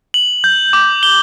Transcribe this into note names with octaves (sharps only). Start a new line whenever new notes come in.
F#7
G6
D6
G7